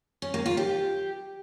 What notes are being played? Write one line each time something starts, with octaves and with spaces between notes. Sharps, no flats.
C#4
A#3
F4
G4